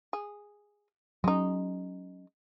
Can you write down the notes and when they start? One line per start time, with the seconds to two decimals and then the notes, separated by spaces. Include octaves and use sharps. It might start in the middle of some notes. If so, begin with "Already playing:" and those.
0.13 G#4
1.24 F#3 G#3 C#4 D#4